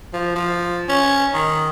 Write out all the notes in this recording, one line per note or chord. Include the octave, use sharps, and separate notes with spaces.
F3
F3
C#4
D#3